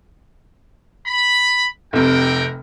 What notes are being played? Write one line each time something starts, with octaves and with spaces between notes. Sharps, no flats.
B5
F1 C3 F#4 A#4 G5